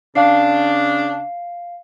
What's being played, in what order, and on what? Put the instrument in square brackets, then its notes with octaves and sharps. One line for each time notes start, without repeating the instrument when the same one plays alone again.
[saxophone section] C#3 D4 [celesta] F5 C7